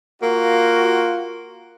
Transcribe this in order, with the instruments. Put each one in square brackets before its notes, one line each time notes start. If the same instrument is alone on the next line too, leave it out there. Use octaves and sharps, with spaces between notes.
[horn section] A#3 F4 F#4